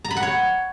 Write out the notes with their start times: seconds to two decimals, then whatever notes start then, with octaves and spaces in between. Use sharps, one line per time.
0.04 A#5
0.11 B5
0.17 F#5
0.23 C#5